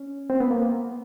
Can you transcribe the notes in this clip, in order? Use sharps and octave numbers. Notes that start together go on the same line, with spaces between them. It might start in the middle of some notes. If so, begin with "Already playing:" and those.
Already playing: C#4
C4
B3
A#3